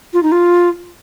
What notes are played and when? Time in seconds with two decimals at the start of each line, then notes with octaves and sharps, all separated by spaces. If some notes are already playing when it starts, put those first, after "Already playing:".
0.13 F4
0.23 D#4
0.32 F4